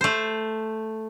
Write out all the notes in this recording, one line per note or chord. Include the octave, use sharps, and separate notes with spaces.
A3 C5